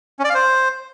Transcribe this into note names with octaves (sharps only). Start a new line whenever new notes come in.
C#4
D5
F5
C5